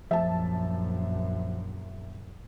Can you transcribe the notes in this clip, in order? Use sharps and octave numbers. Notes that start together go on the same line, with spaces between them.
A#1 F#2 F3 E5 A5